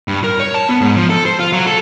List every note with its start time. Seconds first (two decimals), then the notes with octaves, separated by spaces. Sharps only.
0.08 G2
0.24 A#4
0.39 C#5
0.54 A5
0.69 B3
0.81 G#2
0.96 F3
1.10 A4
1.26 C5
1.39 F4
1.53 F#3
1.66 A4